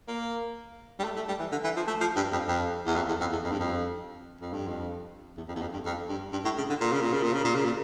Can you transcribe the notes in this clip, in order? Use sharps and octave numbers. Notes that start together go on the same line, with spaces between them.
A#3
G3
A3
A3
G3
E3
D3
E3
F3
A3
F3
G2
F2
F2
E2
F2
E2
F2
E2
F2
G2
F2
F2
G2
F2
E2
F2
E2
F2
G2
F2
G2
G2
A2
C#3
D3
A#2
C#3
A#2
C#3
A#2
C#3
A#2
C#3
A#2